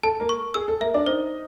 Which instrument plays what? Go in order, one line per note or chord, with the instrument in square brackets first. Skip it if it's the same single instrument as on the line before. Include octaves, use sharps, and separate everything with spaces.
[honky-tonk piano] A4 [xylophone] A5
[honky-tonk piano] A#3 A#4
[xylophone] C#6
[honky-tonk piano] G#4 [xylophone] E6
[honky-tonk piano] A4
[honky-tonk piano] A#3 A#4 [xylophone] E5
[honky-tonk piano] D4 D5
[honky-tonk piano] D#4 D#5 [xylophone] C5